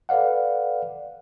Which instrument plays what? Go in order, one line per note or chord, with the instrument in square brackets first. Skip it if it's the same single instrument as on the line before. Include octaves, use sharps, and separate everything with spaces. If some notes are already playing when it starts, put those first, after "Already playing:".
[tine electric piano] A4 B4 D5 F5 F#5